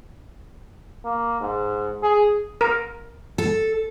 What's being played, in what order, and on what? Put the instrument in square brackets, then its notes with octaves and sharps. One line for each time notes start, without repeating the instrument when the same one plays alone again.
[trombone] A#3
G#2
G#4
[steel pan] A#4
[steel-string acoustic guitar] A4